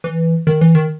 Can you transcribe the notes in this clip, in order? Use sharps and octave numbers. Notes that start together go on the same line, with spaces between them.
E3
D#3
E3
D#3